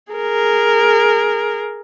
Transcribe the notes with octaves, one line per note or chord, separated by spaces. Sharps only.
G#4 A#4